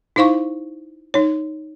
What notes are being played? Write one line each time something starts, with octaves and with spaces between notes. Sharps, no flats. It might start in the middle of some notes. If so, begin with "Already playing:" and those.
D#4 E4 C5 F5 C#6
D#4 C#5